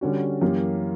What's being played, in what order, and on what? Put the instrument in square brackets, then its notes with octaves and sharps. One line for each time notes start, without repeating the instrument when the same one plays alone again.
[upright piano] D3 G3 C#4 F#4
F#2 E3 A#3 C#4 G4